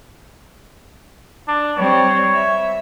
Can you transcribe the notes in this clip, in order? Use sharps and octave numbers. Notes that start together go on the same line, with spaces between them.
D4
G3 C4 C#5
E5